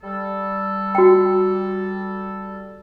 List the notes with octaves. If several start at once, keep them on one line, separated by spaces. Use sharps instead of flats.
G3 A4
F#4 G5